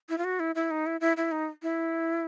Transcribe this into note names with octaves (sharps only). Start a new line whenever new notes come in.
E4
F4
F#4
E4
E4
D#4
E4
E4
E4
D#4
E4